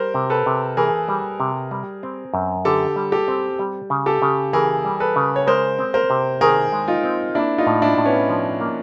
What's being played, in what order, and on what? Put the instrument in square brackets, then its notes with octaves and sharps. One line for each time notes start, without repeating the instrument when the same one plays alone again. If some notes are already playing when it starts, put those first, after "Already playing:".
Already playing: [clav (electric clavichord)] G3 [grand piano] A#4 C5
[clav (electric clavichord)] C3
[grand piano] A4 B4
[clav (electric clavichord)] C3
[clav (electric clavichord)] E3 [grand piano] G#4 A#4
[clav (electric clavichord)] G3
C3
G3
C4
F#2
[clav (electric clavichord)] D3 [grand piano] G4 A4
[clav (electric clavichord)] G3
[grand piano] G4 A4
[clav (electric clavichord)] C4
G3
C#3
[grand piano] G4 A4
[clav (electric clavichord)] C#3
[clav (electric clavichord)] E3 [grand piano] G#4 A#4
[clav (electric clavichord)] G3
[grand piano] A4 B4
[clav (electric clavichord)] C#3
[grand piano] C#5
[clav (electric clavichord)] G#3 [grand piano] A#4 C5
[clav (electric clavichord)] C4
[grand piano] A#4 C5
[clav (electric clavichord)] C3
[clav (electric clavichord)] D#3 [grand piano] G#4 A#4
[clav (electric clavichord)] G#3
[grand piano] D#4 F4
[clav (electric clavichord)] C4
[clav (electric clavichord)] A#3 [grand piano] D4 E4
[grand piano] D#4 F4
[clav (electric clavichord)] A2
[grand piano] D4 E4
[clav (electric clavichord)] A2
[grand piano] B3 C#4
[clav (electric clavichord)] F3
A#3